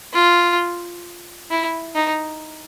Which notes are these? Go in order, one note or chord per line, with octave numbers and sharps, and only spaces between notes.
F4
E4
D#4